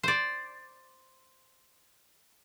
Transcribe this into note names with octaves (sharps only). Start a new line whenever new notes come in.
C5 D5